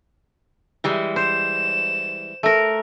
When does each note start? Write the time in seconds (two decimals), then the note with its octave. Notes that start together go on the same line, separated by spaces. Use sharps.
0.84 E3 G3 G#3
1.16 C5 E7
2.43 A3 A#4